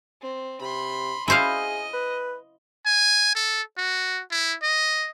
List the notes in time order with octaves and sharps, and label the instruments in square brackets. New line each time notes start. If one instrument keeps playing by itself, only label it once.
[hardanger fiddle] C4
[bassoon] C3 [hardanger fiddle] B5 C6
[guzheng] E4 C5 F5 [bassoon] G#4 [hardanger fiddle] D#5
[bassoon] B4
[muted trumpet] G#5
A4
F#4
E4
D#5